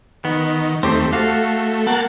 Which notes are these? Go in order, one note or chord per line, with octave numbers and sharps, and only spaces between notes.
D#3 B3
D#2 A3 C4 G4 C5
A3 F#4 A4 F5
A#3 F#5 A5